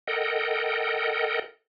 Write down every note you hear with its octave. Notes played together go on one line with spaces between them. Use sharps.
A4 A#4 D#5 F#5 G5